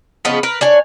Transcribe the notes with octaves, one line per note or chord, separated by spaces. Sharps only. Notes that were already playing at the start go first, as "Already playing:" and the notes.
C#3 F3 B3 D#4
A#4 B4
D4 C#5 G#5